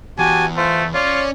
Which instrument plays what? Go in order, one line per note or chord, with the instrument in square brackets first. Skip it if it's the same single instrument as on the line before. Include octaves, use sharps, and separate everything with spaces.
[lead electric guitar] E2 [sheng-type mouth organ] F#4 G4 A5 [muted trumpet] G#5
[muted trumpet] A3 [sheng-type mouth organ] F4 C5
[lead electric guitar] C#4 [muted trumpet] F4 [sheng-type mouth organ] C#5 D5